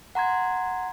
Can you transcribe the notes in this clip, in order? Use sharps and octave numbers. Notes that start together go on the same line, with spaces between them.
F#5 A#5 C6 G#6